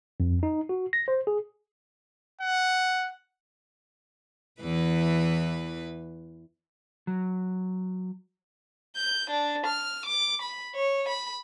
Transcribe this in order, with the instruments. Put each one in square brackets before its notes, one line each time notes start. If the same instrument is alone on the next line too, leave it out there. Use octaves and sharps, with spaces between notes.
[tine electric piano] F2
D#4
F#4
A#6
C5
G#4
[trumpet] F#5
[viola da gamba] E2 E3 B4
[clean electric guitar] F#3
[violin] G6
D4
F6
D6
B5
C#5
B5